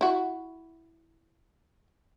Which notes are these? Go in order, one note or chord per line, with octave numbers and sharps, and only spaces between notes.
E4 F#4